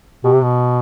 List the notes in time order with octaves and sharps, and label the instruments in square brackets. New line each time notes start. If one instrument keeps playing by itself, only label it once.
[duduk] B2 [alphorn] G4
[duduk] C3
B2